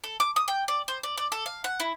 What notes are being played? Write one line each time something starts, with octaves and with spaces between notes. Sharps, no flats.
A4
D6
D#6
G5
D5
C5
D5
D5
A4
F5
F#5
E4